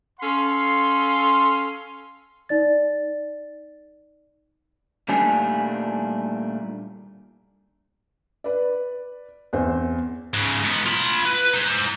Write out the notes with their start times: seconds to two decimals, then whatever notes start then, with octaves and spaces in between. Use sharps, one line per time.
0.20 C#4 A4 F5 C6
2.49 D#4 D5 A6
5.08 A#2 D#3 G3 A3 D4 G#5
8.44 B4 D5
9.53 E2 C4 C5
10.34 G#2 C#3
10.63 G#2 B3
10.86 F4 B5
11.26 B4
11.54 D#4 C5